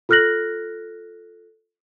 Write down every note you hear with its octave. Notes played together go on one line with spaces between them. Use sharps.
F4 A4 F6 F#6 A#6 F#7